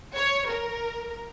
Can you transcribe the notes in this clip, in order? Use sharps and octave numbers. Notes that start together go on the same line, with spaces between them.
C#5
A#4